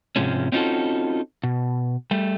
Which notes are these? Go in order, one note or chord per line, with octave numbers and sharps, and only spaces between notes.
G#2 C3 F3 G#3 C#4
C4 C#4 D#4 F4 F#4 A4
B2
G3 A3